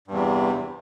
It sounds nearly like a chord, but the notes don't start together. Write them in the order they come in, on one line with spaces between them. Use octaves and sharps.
G2 E2 C3